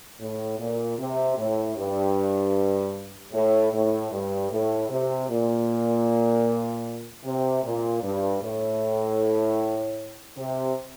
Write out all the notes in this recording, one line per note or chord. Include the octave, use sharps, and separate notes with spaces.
A2
A#2
C3
A2
G2
A2
A2
G2
A2
C3
A#2
C3
A#2
G2
A2
C3